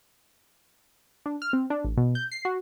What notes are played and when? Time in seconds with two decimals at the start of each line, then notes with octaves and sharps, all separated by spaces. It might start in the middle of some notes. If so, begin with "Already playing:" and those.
1.26 D4
1.42 F6
1.53 C4
1.70 D4
1.84 A1
1.97 B2
2.15 G6
2.31 C7
2.45 F#4